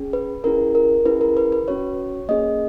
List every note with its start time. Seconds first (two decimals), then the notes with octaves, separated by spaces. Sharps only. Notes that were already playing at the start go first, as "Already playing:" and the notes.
Already playing: C#4 G#4
0.13 B4
0.44 C#4 E4 G#4 A#4
0.75 A#4
1.06 C#4 E4 G#4 B4
1.21 A#4
1.37 B4
1.52 B4
1.68 C#4 F#4 C#5
2.29 A#3 C#4 G#4 D#5